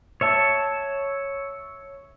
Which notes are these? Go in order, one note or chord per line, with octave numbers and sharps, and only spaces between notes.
C#5 E5 A5